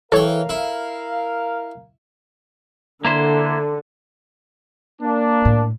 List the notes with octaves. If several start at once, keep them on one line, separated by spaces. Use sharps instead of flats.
E3 A4 A#4 C#5 F5 G5
E4
D3 A#3 E4 C5
A#3 D4
A2